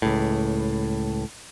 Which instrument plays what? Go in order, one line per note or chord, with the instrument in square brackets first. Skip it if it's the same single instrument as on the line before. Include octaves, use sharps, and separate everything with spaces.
[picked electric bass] C#2 A2